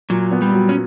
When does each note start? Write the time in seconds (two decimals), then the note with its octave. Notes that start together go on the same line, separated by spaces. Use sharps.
0.10 A#2 F#3
0.32 B3
0.42 G3
0.52 F#3
0.69 C#4